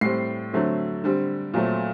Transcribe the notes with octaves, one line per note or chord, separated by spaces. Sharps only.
A2 G3 C4 C7
D3 F#3 A3 C4
D3 G3 C4
A#2 F#3 A3 C4